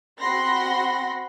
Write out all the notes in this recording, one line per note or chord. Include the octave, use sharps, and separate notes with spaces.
C4 F#4 F#5 B5 C6 A#6